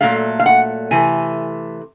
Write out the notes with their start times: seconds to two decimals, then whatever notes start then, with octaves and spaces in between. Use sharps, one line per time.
0.01 A#2 F#3 A3 F5
0.39 F5
0.46 F#5
0.91 C3 E3 A3 G#5